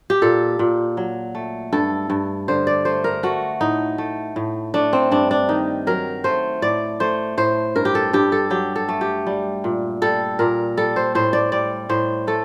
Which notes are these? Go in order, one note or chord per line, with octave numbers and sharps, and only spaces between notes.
G4
A#2 A4
A#2
F#3
A3
G2 A4
G2
D3 C5
D5
A3 C5
A#4
A3 F#4
A2 D#4
A3
A2
A3 D4
C4
G2 D4
D4
D#3 D#4
F#3 A#4
A3 C5
A2 D5
A3 C5
A2 C5
G2 A#4
G4
A4
G2 G4
A4
F#3 G4
A4
A3
G4
G3
A#2
G3 A4
A#2 A#4
G3 A4
C5
A2 C5
D5
G3 D5
A2 C5
A3 A4